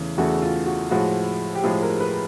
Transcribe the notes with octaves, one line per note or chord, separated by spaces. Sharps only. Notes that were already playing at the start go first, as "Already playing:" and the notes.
Already playing: E2 C#3 E3 A3
E2 C#3 E3 A3 F#4
F4
F#4
A2 F3 G#3 F#4
G4
A2 F3 G#3 G#4
A#4
B4